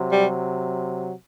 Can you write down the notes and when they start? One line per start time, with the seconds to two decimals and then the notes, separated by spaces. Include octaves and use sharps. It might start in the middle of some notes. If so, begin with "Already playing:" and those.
Already playing: C3 F#3
0.12 G3